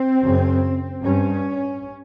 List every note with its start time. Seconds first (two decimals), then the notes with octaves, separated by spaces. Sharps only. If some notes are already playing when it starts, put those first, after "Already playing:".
Already playing: C4
0.21 F#2 C#3
1.01 G2 C#4